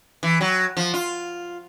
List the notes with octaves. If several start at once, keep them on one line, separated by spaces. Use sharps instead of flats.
E3
F#3
F3
F4